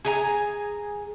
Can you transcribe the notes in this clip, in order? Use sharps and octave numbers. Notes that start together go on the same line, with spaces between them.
G#4 G#5 A#5